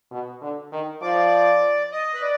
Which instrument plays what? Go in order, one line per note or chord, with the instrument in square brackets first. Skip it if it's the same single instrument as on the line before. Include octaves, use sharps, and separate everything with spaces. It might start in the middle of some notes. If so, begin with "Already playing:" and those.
[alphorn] B2
D3
D#3
[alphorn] F3 [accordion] D5
[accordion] D#5
B4
D5